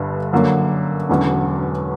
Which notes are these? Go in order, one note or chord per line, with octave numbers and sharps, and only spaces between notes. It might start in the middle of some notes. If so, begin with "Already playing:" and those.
Already playing: G1 G2 D3
F#2 D3 F#3 A#3
E1 E2 D3 F#3 C#4